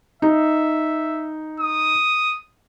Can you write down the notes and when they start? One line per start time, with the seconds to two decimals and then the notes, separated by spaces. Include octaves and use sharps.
0.22 D#4 E5
1.60 D#6